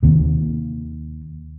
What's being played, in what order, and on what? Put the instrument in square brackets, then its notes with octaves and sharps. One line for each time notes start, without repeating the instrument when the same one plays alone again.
[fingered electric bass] D#2 C3